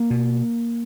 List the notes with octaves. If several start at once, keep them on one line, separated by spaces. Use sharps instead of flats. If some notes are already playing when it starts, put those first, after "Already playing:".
Already playing: A#3
B2